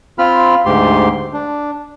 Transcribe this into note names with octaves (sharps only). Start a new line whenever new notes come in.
C4 F4 B5 F6
D2 G#2 G4 C6
D4